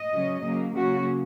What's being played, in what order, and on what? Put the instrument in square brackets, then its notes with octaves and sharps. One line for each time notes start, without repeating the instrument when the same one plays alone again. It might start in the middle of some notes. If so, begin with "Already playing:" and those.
Already playing: [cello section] D#5
C#3 F#3 C#4
C#3 F#3 A#3
C#3 F#3 A#3 C#4 F#4